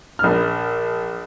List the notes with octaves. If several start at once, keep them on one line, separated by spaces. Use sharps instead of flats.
A#1 F6